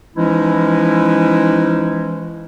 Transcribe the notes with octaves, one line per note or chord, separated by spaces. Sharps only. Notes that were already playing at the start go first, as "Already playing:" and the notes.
E3 F3 G#3 C#4 D#4 E4